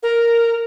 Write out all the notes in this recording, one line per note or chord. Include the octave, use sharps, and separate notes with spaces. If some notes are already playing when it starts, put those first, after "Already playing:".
A#4